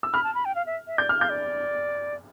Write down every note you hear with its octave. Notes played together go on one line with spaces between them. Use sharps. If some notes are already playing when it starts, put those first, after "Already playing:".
E6
B5 F6
A5
B5
G5
F5
E5
E5
D5 G6
F6
F5 G6
D5